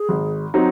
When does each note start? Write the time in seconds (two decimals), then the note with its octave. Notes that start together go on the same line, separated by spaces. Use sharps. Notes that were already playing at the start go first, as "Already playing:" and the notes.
Already playing: G#4
0.09 G#1
0.54 F#3 C4 D#4